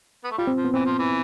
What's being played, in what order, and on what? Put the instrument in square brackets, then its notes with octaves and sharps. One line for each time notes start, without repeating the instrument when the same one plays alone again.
[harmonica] B3
A3
[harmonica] G3 [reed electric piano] F4
[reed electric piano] C4
[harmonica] F3
[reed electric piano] B3
[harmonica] E3 [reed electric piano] C4
[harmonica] F3
E3